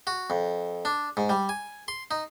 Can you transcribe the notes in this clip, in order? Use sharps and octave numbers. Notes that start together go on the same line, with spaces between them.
F#4
F2
D4
G#2
G3
G#5
C6
D#4